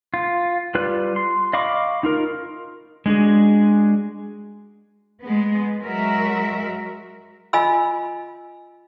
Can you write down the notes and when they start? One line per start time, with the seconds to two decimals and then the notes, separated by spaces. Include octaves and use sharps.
0.14 F4
0.75 G3 F4 B4 F#6
1.16 C6
1.53 D#5 F5 B5 C#6 D6
2.03 D#4 F4 A#4
3.06 G#3 D4 F#4 G#4
5.21 G#3 B3
5.80 F#3 G#3 F#4 A#4 E5
7.53 F4 D#5 G#5 B5 E6